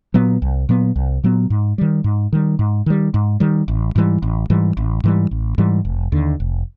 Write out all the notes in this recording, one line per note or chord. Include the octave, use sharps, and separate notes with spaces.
A#2 F#3 B3
C2
A#2 F#3 B3
C2
A#2 F#3 B3
G#2
D#3 G3
G#2
D#3 G3
G#2
D#3 G3
G#2
D#3 G3
A1
G#2 E3 G3
A1
G#2 E3 G3
A1
G#2 E3 G3
A1
G#2 E3 G3
F1
D#2 D3
F1